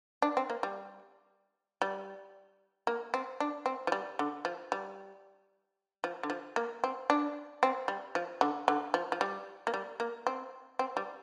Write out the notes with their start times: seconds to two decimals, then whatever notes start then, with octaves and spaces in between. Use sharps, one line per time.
0.22 D4
0.37 C4
0.50 A#3
0.63 G3
1.82 G3
2.87 A#3
3.14 C4
3.40 D4
3.66 C4
3.87 F3
3.92 G3
4.19 D3
4.45 F3
4.72 G3
6.04 F3
6.23 D3
6.30 F3
6.56 A#3
6.84 C4
7.10 D4
7.63 C4
7.88 G3
8.15 F3
8.41 D3
8.68 D3
8.94 F3
9.12 F3
9.21 G3
9.67 A#3
9.74 G3
10.00 A#3
10.27 C4
10.79 C4
10.97 G3